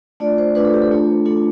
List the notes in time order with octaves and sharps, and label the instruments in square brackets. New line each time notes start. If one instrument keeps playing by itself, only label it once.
[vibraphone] A3 D4 F4 D5
C5
A3 D4 F4 B4
A4
G4
A4
A3 D4 F4
A3 D4 F4 A4